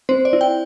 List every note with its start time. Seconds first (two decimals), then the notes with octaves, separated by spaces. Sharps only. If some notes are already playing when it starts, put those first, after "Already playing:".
0.09 C4 C5
0.25 D5
0.33 E4
0.41 G5